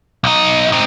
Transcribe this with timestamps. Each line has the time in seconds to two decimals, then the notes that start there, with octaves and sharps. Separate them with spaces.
0.24 B1 D#4
0.72 C4 D#4